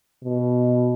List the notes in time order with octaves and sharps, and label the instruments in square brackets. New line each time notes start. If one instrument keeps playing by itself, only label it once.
[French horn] B2